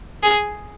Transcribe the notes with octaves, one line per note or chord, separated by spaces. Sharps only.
G#4